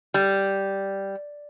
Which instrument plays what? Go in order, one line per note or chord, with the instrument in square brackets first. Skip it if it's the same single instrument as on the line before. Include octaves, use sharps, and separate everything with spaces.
[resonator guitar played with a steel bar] G3